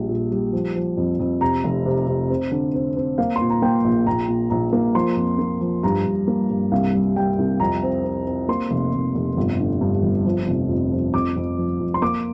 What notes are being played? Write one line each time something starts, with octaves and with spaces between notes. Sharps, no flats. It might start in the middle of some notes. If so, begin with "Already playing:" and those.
Already playing: A#1 G3
A#2
G3
F3
F3
F2
F2
C3 A#5
F1
C3
C3
C4
D3
C4
C4
A#3 F5
A#2 C6
A#5
A#3 G5
A#1
A#1 A#5
A#2
A#1 A#5
A#3
F3 C6
F2
A#3
F3
G2 A#5
G2
A#3
G2
C2 F5
G3
G3 G5
C2
F2 A#5
C4
C4
C4
A#3 C6
F1
F1
F1
G1
D3
G2
G1
F3
F1
F2
F3
F2 D6
F2
F3
F2
C6
A#3 D6